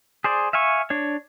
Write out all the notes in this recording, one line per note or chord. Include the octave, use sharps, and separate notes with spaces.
G#4 C5 D5
E5 F5 G#5 C#6
D4 C#5